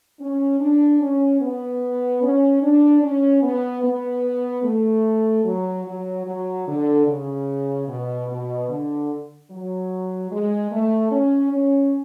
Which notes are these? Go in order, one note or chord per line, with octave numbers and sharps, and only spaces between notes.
C#4
D4
C#4
B3
C#4
D4
C#4
B3
B3
A3
F#3
F#3
F#3
D3
C#3
B2
B2
D3
F#3
G#3
A3
C#4
C#4